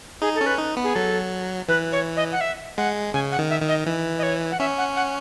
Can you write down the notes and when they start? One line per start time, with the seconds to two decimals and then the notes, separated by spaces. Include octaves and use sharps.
0.22 D#4 G#4
0.35 A4
0.41 C#4
0.46 B4
0.58 D#4
0.77 B3
0.84 G#4
0.95 F#3 A4
1.68 E3 B4
1.92 C#5
2.16 D#5
2.32 F#5
2.41 E5
2.77 G#3 F#5
3.14 C#3 G#5
3.32 F#5
3.39 D#3
3.50 E5
3.62 D#3
3.68 D#5
3.86 E3
4.18 D#5
4.23 C#5
4.51 F#5
4.60 C#4 E5
4.78 F#5
4.96 F#5